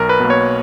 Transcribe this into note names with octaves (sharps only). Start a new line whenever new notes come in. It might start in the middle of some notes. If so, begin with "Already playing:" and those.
Already playing: B1 A#4
B4
B2 A#3
C#5